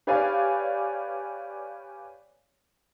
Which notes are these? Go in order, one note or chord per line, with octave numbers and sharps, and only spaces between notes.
G4 B4 C#5 D5 F5 G#5